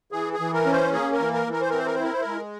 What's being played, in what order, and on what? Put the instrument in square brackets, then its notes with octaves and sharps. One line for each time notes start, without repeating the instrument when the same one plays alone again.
[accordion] E3 G#4
G#4
E3
A#4
C#4
C5
A#3 G#4
A#4
E3
A#4
E3
A#4
C5
C4 A#4
C5
A#4
C5
E4 A#4
C5
G#3 A#4